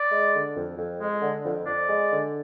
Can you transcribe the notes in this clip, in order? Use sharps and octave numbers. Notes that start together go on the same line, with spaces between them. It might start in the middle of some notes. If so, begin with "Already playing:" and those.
Already playing: D5
G#3
D3
F2
F2
G#3
D3
F2
F2 D5
G#3
D3